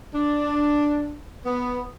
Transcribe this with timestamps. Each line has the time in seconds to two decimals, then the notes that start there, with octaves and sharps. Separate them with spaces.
0.13 D4
1.44 B3